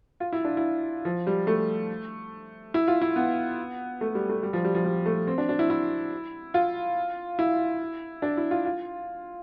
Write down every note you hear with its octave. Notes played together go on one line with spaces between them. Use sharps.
F4
E4
D4
E4
F3
G3
A3
E4
F4
E4
B3
A3
G3
A3
G3
F3
G3
F3
G3
A3
C4
D4
D4
E4
E4
F4
E4
D4
E4
F4
F4